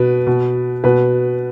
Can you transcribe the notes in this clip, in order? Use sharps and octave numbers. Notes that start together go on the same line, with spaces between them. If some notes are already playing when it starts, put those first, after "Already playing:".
Already playing: B2 B4
B2
B2 B4